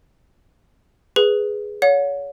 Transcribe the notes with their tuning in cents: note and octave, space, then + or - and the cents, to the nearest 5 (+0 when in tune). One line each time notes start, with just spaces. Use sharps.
G#4 +0 B4 +0
C#5 +25 F#5 -40